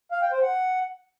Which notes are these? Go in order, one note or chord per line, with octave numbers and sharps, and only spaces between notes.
F5
G5
C5
F#5